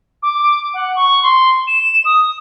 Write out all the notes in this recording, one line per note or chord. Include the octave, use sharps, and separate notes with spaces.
D6
F#5
C#6
C6
E7
D#6